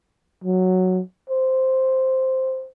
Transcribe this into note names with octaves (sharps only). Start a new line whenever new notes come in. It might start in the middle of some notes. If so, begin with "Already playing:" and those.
F#3
C5